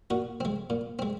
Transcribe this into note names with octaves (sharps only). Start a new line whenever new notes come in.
A#2 F#4
G#3 C4
A#2
G#3 C4